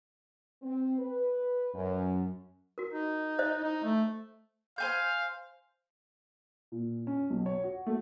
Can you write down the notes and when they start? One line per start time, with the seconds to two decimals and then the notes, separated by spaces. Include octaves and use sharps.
0.63 C4
0.98 B4
1.74 F#2
2.78 F#4 A#4
2.90 D#4
3.39 C5 D#5
3.64 D#4
3.84 A3
4.78 C5 F5 G#5 G6
6.72 A#2
7.07 C#4
7.30 B1
7.46 C#5
7.64 F#4
7.86 A3